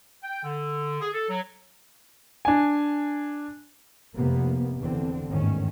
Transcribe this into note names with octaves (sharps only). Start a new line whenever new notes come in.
G5
D3
G#4
A4
F#3
D4 G#5
F1 C3 A#3 B3
E2 D3 C4
G1 E2 G#2 D#3 A3 C#4